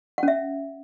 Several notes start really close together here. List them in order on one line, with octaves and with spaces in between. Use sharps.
F#5 C#4 E5